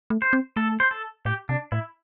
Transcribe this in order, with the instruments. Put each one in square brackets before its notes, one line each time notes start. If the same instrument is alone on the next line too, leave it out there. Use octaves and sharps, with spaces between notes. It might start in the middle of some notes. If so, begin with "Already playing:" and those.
[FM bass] A3
[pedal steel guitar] C5
[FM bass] C4
[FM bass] A3 [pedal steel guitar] A4
[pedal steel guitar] C5
A4
[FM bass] A2 [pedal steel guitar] G4
[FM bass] C3 [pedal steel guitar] D4
[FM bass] A2 [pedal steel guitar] E4